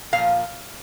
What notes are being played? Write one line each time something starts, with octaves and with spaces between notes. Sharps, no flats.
A#2 F5
F3